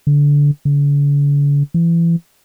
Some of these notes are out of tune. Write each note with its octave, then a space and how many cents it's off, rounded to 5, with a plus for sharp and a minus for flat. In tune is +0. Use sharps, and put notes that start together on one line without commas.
D3 -20
D3 -45
E3 +30